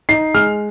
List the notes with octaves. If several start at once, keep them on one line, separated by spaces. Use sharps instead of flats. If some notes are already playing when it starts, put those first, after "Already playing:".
D#4 C7
G#3 F6